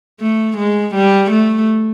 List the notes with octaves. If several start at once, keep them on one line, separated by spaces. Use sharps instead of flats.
A3
G#3
G3
A3